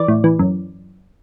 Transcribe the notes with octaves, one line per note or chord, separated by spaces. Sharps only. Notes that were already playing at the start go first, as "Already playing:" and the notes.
Already playing: E3 D5
A2
E3
F#2